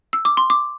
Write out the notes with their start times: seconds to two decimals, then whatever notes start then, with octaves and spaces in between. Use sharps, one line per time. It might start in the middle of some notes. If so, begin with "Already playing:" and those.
0.13 E6
0.25 D6
0.37 C6
0.50 D6